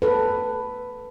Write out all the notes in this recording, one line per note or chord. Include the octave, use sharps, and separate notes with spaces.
A4 B4